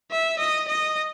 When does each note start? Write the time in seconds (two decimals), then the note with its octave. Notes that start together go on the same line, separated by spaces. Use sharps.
0.11 E5
0.39 D#5
0.68 D#5